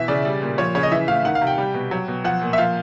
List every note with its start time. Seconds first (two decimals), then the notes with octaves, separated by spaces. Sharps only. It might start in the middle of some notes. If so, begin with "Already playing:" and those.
Already playing: B2 E3 E5
0.08 C#3 D5
0.25 G3
0.42 A#2
0.58 F3 C#5
0.75 C#3 C#5
0.83 D#5
0.91 E3 E5
1.08 A2 F5
1.24 D#3 F#5
1.35 F5
1.41 C3
1.47 G5
1.58 G3
1.74 B2
1.91 F#3
2.08 B2
2.24 F3 F#5
2.42 A#2
2.53 E5
2.58 F3 F5